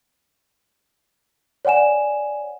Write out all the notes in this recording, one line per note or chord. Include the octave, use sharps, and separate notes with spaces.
C#5 D5 F#5 G#5 E7